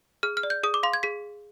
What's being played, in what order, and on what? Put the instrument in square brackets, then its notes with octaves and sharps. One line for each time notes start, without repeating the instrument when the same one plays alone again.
[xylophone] G#4 F6
F6
D5
G6
G#4 D#6
D6
F5 C6
G#6
G#4 B6